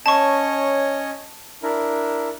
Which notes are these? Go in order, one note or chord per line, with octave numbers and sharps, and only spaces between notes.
C#4 C#5 D#5 A5 C#6
D4 E4 A#4